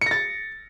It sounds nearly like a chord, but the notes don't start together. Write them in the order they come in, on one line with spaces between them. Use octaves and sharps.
C#7 A#6 A6